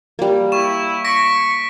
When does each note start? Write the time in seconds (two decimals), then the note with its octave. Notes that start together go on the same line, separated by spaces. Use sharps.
0.19 G3 A#3
0.52 E4 C#6 E7
1.04 C#6 A#6 B6 D7